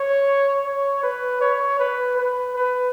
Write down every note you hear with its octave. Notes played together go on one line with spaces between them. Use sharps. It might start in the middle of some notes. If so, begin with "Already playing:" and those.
Already playing: C#5
C#5
B4
C#5
B4
B4
B4